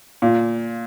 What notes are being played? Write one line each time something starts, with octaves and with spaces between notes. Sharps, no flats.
A#2